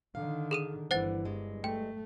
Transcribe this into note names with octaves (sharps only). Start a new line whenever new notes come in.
D3 D#3 F5
G#4 A4 D#7
G1 D3 E3 C5 F#5 A6
G2 G#3
A3 G5